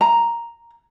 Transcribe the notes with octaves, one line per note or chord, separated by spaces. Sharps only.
A#5